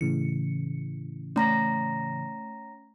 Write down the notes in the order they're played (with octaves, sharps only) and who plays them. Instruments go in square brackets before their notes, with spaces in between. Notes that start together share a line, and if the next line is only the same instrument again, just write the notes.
[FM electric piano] A2 C#3 E3 [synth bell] C#7
[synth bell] A3 [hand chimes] C#4 A#5 A#6